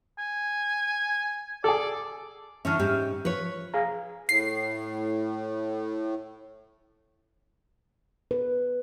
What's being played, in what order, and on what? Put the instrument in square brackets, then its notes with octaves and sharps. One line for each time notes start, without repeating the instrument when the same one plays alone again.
[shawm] G#5
[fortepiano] G#4 A4 [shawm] D5
[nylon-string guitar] D3 E3 C#4 [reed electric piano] E5 C#6 F6
[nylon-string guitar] G#2 C#4 G4
[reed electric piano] F3 [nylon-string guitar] B4 C#5
[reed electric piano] G#4 F5 A#5
[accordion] A2 [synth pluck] C7
[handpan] B4